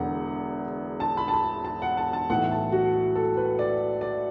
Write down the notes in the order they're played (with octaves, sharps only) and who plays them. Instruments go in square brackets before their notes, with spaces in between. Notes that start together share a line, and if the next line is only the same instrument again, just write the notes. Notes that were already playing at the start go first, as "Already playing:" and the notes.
Already playing: [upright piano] E1 E2 D3 F#5
A5
B5
A5
B5
A5
F#5
A5
A5
B1 A2 E3 F#5
A5
F#4
A4
B4
D5
D5